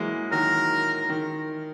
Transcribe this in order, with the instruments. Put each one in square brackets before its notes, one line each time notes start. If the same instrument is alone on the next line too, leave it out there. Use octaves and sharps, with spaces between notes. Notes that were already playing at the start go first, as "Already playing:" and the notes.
Already playing: [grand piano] E3 F#3 G#3 A#3
[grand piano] D#3 F#3 [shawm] A#4
[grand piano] D#3